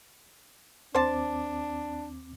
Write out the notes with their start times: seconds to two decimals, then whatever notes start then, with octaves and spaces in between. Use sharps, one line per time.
0.95 D#2 C4 D4 C5 A5 D6